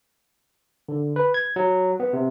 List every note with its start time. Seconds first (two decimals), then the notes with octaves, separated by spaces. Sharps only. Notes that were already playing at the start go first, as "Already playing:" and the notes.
0.89 D3
1.16 B4
1.34 G#6
1.56 F#3
2.00 B3
2.13 C3